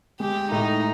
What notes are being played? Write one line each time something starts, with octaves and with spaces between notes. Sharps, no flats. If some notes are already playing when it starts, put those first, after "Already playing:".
G#3 G4
A2 D#4